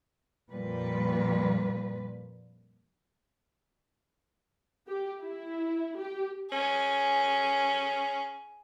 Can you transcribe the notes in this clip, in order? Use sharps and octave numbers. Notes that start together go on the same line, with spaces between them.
F2 A#2 G3 B4
G4
E4
G4
C#4 G#4